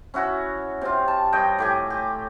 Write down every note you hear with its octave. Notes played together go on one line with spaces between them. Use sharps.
C#4 E4 F#4
C3 F4
A5
G2 C#5 D#5 G5
A2 G4 G#5
G4